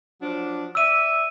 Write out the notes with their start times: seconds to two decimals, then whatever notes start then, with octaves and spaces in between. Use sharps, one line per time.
0.22 F3 F#3 D4
0.75 D5 E5 E6 D#7